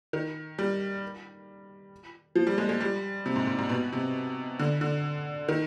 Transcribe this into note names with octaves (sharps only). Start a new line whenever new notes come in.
D#3
G3
F3
G3
G#3
G#3
G3
C3
G#2
G#2
G#2
B2
C3
D3
D3
D#3